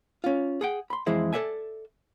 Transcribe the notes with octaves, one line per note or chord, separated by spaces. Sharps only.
C#4 F4
G#4 F#5 G5
B5 C6
F2 E3 G#3 E4 G#4 C5
A4 C5 D5 E5 G#5